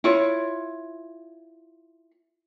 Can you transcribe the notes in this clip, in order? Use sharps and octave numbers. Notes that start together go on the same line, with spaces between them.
E4 F4 C#5